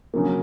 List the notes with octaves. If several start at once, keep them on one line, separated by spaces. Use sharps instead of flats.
C#3 F#3 A#3